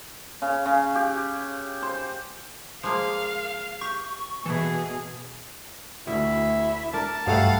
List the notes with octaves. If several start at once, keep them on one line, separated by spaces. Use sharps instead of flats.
C#3
C#3
G4
C5
F3 G#3 A#3 F5
G4 C#6
B2 E3 E4 G#4 A4
D2 B2 E4
D4 A#4 A5
B1 G2 B2 G3 A3 F5 F#5